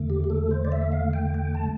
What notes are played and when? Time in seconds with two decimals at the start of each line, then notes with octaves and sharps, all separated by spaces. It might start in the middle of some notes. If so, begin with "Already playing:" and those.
Already playing: E2 D3 A3
0.10 G4
0.24 G4
0.30 A4
0.51 C5
0.65 D5
0.72 E5
0.92 F5
1.13 G5
1.34 G5
1.55 A5